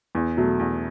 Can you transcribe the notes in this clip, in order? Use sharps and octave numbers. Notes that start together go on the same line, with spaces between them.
E2
B2 F#3 A3
E2